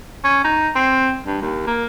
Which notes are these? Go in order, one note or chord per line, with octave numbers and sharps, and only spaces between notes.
C#4
D#4
C4
G2
D#2
A#3